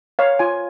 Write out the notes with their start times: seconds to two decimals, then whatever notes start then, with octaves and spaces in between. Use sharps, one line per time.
0.19 C#5 F5
0.39 F4 G#5